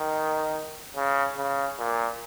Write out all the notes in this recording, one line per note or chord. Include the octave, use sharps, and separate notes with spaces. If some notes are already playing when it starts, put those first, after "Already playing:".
Already playing: D#3
C#3
C#3
A#2